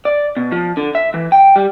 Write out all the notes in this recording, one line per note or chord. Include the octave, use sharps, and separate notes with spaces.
D5
B2
F3
D3
E5
E3
G5
G3